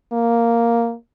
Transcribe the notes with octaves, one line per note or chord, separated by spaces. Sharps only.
A#3